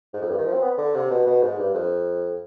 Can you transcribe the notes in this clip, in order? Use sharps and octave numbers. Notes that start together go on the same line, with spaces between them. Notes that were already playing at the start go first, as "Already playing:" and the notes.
G#2
F2
G2
D#3
F3
C4
B3
D3
C3
B2
B2
G#2
G2
F2